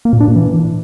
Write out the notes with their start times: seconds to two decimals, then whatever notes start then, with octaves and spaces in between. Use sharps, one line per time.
0.05 A#3
0.13 A#2
0.20 D4
0.28 A#2
0.36 E3